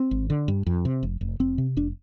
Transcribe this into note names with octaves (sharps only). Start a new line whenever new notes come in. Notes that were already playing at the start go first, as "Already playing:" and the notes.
Already playing: C4
G#1
D3
G2
F2
C3
F1
F1
F1 C4
C3
F1 D4